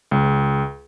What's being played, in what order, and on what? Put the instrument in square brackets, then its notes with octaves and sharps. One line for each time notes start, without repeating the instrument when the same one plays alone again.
[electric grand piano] C#2